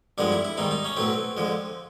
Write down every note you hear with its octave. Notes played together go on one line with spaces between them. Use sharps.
G2 D3 F3 G#3 D4
E4
E4
G#2 D#3 G3 D#4
D#4
C#4
B1 A2 F#3 A3 C4
F2 D3 F3 G#3